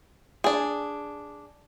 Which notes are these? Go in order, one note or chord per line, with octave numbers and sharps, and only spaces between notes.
D4 G#4